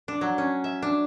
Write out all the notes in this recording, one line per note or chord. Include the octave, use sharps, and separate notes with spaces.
D4
F#3
C#4
E5
D4